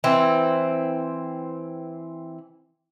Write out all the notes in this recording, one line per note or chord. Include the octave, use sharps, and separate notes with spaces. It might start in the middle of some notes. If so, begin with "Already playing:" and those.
E3 C4